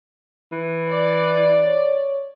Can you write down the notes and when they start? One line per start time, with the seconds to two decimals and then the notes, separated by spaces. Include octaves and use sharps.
0.52 E3
0.90 D5
1.65 C#5